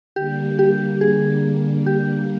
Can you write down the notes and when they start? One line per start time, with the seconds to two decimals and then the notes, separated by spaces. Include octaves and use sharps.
0.16 D3 G3 A#3 G4
0.59 G4
1.01 G#4
1.86 G4